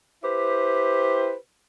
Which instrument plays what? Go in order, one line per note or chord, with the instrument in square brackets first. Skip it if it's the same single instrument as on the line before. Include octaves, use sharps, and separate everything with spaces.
[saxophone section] E4 G4 B4 C5